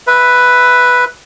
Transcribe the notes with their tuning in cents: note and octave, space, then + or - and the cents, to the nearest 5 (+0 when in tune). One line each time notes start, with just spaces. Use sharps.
B4 +0 E5 +0